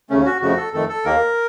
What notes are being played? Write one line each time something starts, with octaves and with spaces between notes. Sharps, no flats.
D#2 C#3 A3 C#4
F#4
F2 C#3 F3 A3 F#4
A4
F2 D#3 A3 A4
A4
D#2 D#3 A#3 A#4